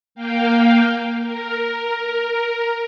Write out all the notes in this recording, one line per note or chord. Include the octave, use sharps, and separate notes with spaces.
A#3 F5 G5
A#4